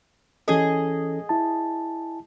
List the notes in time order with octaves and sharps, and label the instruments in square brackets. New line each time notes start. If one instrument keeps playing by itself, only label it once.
[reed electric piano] E3 C#4 A4 [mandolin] G#4 D#5
[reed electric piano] E4 A5